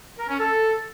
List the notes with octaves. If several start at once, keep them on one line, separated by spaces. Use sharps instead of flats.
A#4
C#4
A4